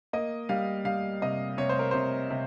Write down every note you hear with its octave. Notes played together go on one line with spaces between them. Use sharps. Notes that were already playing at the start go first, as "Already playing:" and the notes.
A#3 D#5
G3 F5
G3 F5
C3 D#5
C3 C#5
C5
A#4
C3 C5
C3